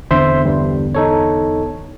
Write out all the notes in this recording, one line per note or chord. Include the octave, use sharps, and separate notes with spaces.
E2 D3 C4 C5 E5 C6
G2 G3
D#4 A4 C#5